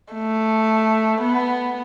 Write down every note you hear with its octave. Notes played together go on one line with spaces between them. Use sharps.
A3
B3